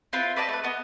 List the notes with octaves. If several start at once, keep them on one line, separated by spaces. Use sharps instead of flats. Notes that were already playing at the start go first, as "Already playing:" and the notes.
C4 E4 F4 B4
B4 D5 D#5 A5
A3 B4
B3 D#5